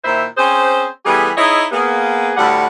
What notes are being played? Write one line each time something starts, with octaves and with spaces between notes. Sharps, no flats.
A#2 D#3 E4 C5 E5
C4 C#4 G#4 C5
E3 G3 A3 B3 G4 G#4
D#4 E4 G#4 C#5 D#5 E5
A#3 B3 G#4
D2 A2 G3 F#5